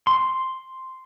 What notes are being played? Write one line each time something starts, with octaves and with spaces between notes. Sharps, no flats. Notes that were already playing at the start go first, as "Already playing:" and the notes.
C6